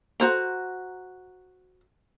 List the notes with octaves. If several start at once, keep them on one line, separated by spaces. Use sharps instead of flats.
F#4 C5 A#5